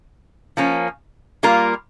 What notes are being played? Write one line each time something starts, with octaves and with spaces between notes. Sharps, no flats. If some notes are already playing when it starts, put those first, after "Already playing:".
F3 A#3 C#4
G3 A#3 F4 A#4